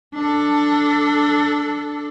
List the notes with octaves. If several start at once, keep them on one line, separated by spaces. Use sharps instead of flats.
D4 A4